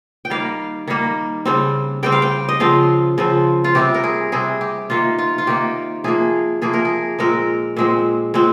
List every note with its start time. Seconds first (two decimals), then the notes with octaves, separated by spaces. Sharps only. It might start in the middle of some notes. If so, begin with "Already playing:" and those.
0.25 G5
0.30 D#3 G3 A#3 F5
0.88 D#3 G3 A#3
1.45 C#3 G3 C4
2.03 C#3 G3 C4 G5
2.12 F5
2.22 G5
2.49 D#5
2.60 C#3 F3 C4 F5
3.18 C#3 F3 C4
3.64 F4
3.75 C3 G3 C4 G4
3.94 A#4
4.04 G#4
4.32 C3 G3 C4 G#4
4.61 G4
4.90 C3 D#3 A#3 F4
5.18 F4
5.38 F4
5.47 C3 D#3 A#3 G4
6.04 C3 F3 A#3 G#4
6.62 C3 F3 A#3 G#4
6.73 A#4
6.85 G#4
7.19 A#2 G#3 C4 A#4
7.77 A#2 G#3 C4
8.34 A#2 G#3 C4